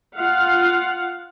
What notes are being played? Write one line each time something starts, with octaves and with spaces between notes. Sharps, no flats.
F4 F5 F#5